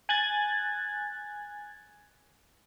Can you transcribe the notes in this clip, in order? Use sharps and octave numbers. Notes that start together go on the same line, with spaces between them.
G#5 F#6 G#6 A6